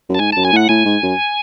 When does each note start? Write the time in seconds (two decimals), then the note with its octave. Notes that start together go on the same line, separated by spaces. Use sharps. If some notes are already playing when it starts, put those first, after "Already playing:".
0.09 F#2
0.15 A5
0.19 G#2 G#5
0.32 F#2 A5
0.45 G#5
0.53 A2 F#5
0.69 A2 G#5
0.85 G#2
1.02 F#2